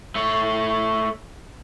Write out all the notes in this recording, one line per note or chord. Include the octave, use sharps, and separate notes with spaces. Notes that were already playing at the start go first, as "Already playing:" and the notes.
A3 C#5